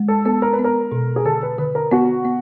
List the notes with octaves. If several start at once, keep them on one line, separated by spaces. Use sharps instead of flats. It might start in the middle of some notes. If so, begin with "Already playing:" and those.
Already playing: G#3
A4
B3 A4
A#4
B4
B3
A#4
B2
G#4
D3 A4
B4
D3 B4
A#4
B3 F#4
B3